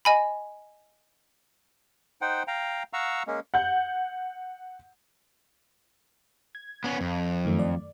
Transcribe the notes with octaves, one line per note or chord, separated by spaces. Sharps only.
D#5 G#5 B5
D#4 C5 F#5 G5
F5 G5 A#5
F5 F#5 A#5 C#6 E6
G#3 A#3 C#4
F#5 G6
G#6
B3 C#4
F2
F#2 D#3 A3
D5